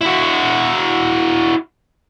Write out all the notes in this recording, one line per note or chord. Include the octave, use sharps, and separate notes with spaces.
E4 F#4